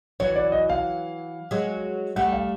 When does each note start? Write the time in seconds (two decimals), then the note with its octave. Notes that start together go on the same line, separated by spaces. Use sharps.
0.20 E3 F#3 C#5
0.36 D5
0.52 D#5
0.70 F5
1.51 F#3 G#3
2.16 G3 A3 F#5
2.33 F5